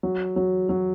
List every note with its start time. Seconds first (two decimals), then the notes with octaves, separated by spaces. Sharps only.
0.03 F#3
0.36 F#3
0.69 F#3